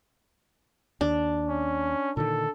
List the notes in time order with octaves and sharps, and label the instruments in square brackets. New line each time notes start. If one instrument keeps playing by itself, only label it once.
[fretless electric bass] D#2 [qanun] D4
[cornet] C#4
[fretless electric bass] A#2 D3 D#3 [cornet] A4